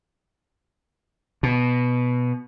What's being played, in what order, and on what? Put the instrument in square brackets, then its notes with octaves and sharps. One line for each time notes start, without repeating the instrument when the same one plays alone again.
[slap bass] B2